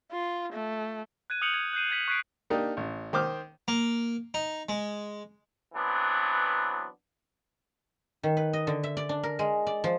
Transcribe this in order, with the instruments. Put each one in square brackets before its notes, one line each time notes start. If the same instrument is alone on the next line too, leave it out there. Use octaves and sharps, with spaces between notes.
[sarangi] F4
A3
[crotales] F#6 G#6 D#7
D#6 F6 G6 C#7 F7 F#7
G#6
F#6 G6 C7 D#7
F#6 G#6 B6 F#7
C#6 F#6 G#6 B6 C7 D7
[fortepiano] A#3 D4 D#4 G4
A1
D#3 C5 D6 F6
[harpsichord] A#3
D#4
G#3
[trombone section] E3 F#3 B3 C4 D4
[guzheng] D#3
B4
D#5
D3
E5
D5
D4
A#4
G#3
D5
F3